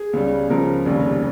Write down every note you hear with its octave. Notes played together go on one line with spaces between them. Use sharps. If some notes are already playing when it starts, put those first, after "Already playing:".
Already playing: G#4
C#2 C#3 G3
C#2 C#3 F3 A#4
F1 D#2 C#3 G3